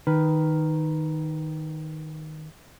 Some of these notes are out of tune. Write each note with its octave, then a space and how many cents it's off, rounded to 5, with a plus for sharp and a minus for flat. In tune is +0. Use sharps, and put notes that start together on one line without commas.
D#3 +0 B4 +0